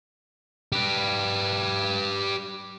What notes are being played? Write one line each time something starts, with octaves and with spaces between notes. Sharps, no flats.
G4 B4